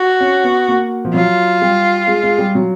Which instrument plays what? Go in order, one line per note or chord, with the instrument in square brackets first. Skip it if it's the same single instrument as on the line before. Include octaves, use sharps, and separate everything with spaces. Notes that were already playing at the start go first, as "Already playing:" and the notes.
Already playing: [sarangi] F#4
[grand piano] C#4
B3
A#3
F3
[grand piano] F#3 [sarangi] F4
[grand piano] G3
G#3
G#3
G3
F#3